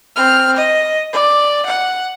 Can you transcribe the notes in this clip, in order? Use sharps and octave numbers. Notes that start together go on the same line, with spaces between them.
C4 F6
D#5
D5
F#5